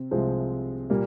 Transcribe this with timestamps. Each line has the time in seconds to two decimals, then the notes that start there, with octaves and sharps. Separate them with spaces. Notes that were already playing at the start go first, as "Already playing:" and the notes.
Already playing: C3 C4
0.11 C2 C3 F3 G#3 C4
0.90 A#2 G3 A#3